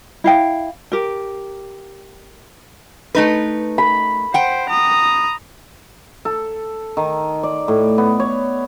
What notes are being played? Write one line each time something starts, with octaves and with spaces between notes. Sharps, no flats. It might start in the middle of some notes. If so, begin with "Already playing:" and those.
E4 F5 G5
G4 A#4
A3 D#4 B4
B5
C5 F#5 G5
A#5 D#6
A4
D#3
D5
A2
B3
C#5